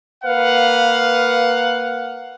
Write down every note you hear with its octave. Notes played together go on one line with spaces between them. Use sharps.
A#3 B4 F5 F#5